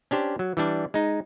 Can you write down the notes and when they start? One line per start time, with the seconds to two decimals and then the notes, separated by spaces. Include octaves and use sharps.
0.11 C#4 D4 G4 C5
0.39 F#3
0.57 E3 G3 D4
0.94 G#3 D#4